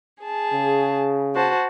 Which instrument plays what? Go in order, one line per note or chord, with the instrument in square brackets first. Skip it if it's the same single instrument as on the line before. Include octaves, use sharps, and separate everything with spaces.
[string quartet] G#4 A5
[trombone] C#3
[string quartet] F#4 C5 A5